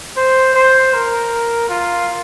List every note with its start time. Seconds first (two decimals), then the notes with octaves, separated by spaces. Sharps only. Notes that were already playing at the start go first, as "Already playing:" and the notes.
0.17 C5
0.55 C5
0.94 A#4
1.69 F4